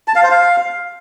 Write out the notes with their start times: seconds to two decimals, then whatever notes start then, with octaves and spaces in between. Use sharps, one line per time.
0.08 A5
0.15 F5
0.23 C5
0.31 F5